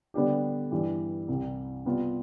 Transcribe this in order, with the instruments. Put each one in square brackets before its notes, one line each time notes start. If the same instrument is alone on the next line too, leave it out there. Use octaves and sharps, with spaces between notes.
[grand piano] D3 G3 B3 D4 G4
G2 E3 G3
C2 C3 G3
C3 G3 B3 F4